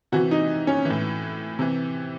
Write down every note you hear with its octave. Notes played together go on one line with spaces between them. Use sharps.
C3 E3 F#4
D#4
C#4
A2 E3
C3 E3